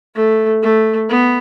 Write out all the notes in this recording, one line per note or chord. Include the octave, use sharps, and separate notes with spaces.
A3
A3
B3